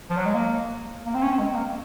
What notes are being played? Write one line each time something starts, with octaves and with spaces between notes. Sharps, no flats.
F3
F#3
G#3
A#3
A#3
C4
C#4
C4
G#3
C4
A#3